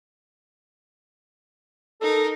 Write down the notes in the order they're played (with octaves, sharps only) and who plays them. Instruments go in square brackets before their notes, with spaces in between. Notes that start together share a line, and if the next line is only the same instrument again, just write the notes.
[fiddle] D#4 A#4 [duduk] A4